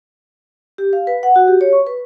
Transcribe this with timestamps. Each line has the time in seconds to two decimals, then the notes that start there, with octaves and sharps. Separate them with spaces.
0.78 G4
0.93 F5
1.07 B4
1.23 F#5
1.36 F#4
1.48 G4
1.61 C#5
1.73 C#6
1.87 B4